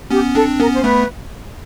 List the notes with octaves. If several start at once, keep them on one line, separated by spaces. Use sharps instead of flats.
B3 C#4 G4
C4 D4 A4
B3 C#4 A#4
C5
A3 B3 B4